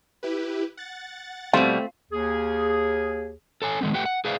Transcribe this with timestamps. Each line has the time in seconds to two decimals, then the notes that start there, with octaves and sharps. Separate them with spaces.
0.23 E4 G4 B4
0.77 F#5 A6
1.53 B2 G3 A3 C4 F4
2.11 D#2 G#4
3.62 A4 C#5 G#5
3.81 D#3 G#3 A3 B3 C4
3.93 A3 G4 B4 F#5 G5
4.05 F#5
4.25 G#4 B4 C5 D5 E5 F5